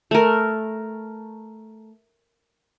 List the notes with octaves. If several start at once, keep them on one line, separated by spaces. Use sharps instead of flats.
A3 A#4